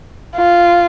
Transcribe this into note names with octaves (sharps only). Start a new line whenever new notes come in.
F4